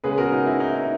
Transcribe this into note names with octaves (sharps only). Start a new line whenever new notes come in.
C#3 G#3 B3 G#4 B4
F#4 A#4
D#4 F#4
E4
D#4
E4
D#4